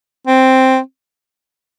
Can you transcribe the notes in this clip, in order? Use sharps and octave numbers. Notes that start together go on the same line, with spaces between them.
C4